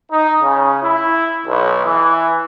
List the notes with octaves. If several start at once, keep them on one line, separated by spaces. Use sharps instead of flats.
D#4
C#3
E4
B1
E3